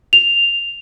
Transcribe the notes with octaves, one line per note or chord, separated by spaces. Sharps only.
F7